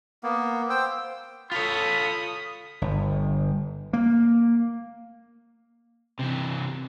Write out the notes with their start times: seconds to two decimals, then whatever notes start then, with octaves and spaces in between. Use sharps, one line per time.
0.23 A#3 B3
0.70 C5 G5 E6
1.52 F4 A4 C#5 B5 D#6
2.81 G1
3.93 A#3
6.19 C3 E3